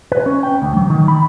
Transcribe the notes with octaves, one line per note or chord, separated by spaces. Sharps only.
B4
C#4
G5
D2
F#3
D#3
B5